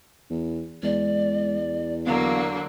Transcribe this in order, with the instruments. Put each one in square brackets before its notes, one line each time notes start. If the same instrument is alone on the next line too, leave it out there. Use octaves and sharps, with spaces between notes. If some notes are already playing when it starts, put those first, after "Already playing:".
[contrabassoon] E2
[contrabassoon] E2 [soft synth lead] G#3 [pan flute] D5
[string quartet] D3 F#3 A#3 [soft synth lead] B3 [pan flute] F5